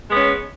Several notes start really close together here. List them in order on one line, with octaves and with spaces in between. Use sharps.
G#3 B3 C#4